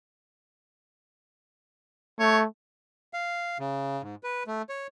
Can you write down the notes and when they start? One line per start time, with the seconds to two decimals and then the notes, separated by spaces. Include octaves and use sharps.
2.19 A3 C#5
3.13 F5
3.60 C#3
4.02 G#2
4.23 B4
4.47 A3
4.69 C#5